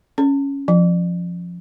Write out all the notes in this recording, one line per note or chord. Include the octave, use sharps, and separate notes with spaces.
C#4
F3